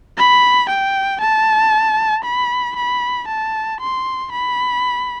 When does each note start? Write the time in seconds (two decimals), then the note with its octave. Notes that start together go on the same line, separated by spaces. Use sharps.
0.18 B5
0.70 G5
1.21 A5
2.24 B5
2.76 B5
3.28 A5
3.80 C6
4.32 B5